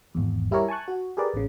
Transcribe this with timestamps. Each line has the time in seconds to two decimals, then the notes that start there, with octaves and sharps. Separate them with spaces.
0.15 G#1 E2
0.51 G3 E4 G4 A#4 C#5
0.68 G#5 A5 C#6 F#6
0.88 F#4
1.17 G4 G#4 A#4 B4 D5
1.33 A1 C#3